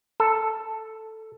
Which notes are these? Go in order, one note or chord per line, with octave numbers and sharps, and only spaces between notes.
A4